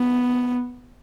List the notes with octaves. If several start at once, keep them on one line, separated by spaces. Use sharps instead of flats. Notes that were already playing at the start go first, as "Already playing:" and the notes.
Already playing: B3